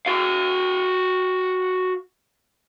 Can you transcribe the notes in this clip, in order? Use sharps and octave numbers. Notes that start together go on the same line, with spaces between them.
F#4 F5